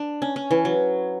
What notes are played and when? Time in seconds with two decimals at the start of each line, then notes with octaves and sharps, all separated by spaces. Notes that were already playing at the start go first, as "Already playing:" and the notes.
Already playing: D4
0.22 C#4
0.36 C#4
0.51 E3
0.65 F#3